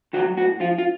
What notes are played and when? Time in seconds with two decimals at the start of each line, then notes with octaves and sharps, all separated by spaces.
0.13 D#3 F#4
0.17 F#3
0.37 A2 F#4
0.60 F3 F4
0.78 F4